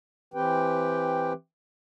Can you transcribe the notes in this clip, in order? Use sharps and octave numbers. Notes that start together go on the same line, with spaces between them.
E3 C4 G4 B4 G5